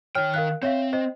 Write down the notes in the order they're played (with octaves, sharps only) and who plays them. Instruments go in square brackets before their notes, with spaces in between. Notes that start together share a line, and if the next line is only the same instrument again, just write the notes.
[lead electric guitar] D#3 G5 [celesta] C#5 F6
[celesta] A#4 F5 F#6
[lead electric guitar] C4 [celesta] C#5 E5 F5
[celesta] C5 D#5